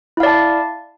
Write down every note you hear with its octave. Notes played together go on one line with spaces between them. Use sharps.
E4 D5 F5 A5